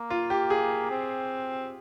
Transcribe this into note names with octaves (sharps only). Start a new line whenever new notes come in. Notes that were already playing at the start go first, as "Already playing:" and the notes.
Already playing: A#3
F4
G4
G#4
C4